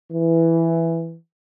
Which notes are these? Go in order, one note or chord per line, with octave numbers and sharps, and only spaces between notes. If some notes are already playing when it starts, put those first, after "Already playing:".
E3